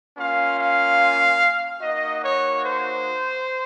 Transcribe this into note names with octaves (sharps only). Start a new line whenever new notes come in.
A#3 C#4 F4 F5
F5
A#3 D#4 F#4 D#5
C#5
C5